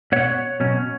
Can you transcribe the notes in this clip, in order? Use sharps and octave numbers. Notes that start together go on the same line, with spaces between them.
B2 B3 C#5 F#5
B2 F#3 C#4